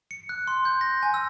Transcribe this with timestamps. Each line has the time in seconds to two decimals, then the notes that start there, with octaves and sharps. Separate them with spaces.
0.11 C#7
0.29 F#6
0.47 C6
0.65 G6
0.81 A#6
1.03 G#5
1.14 E6